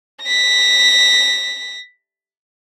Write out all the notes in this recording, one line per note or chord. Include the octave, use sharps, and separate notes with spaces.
A#6 B6